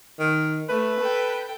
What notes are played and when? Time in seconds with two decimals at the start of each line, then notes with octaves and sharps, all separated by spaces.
0.19 D#3
0.69 A3 B4
1.00 A4 G5